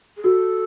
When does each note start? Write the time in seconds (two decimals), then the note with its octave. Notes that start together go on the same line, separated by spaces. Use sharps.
0.17 G#4
0.24 F#4 A4